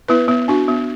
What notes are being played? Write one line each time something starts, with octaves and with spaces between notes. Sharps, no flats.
B3 E4 B4
B3
D4 F#4
B3